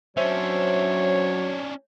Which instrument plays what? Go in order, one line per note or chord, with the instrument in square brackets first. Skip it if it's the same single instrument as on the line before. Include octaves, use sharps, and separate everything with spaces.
[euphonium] F#3 [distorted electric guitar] C#4 D4 [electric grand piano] C5 E5 [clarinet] C#5